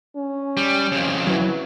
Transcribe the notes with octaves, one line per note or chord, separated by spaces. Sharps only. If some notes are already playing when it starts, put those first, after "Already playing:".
C#4
G3
F2 C#3
E3 F#3